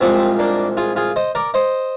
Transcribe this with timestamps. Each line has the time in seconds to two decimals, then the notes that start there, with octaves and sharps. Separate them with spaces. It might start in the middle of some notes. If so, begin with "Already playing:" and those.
0.01 C2 A#2 F3 G#3 C4
0.39 A#3 D4
0.77 F4 G#4
0.96 F4 G#4
1.16 C5 D#5
1.35 A#4 D5
1.54 C5 D#5